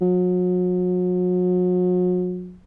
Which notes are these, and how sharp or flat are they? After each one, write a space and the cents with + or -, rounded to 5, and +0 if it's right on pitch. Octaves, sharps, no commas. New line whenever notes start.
F#3 -40